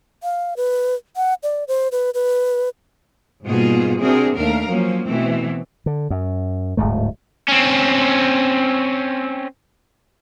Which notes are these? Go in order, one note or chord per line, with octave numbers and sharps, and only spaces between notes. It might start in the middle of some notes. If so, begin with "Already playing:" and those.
F5
B4
F#5
D5
C5
B4
B4
G#2 B2 G3 A#3 F4 G#4
C3 C4 D4 F#4 G#4 A#4
D#2 A3 D4 A#4 F5
F3 F#3 A#3 C#4
B2 E3 A3 C4
D3
F#2
D1 G#1 G#2 A3
C4 C#4